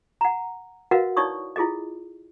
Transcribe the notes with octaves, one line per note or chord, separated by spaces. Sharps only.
F#5 A#5
F#4 A#4 B4 D#5 F5 F#5
D#4 E4 C#5 D5 C#6 D#6
E4 F4 G#4 A4 D#5